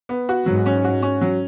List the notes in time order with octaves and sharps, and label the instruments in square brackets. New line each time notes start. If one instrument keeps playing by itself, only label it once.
[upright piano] B3
F#4
[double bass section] G#2 [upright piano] F#3
[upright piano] C#4
F#4
C#4
F#3